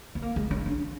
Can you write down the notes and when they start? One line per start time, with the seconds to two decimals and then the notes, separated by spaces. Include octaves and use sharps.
0.15 B3
0.22 A#3
0.36 G#3
0.51 C#4
0.66 D4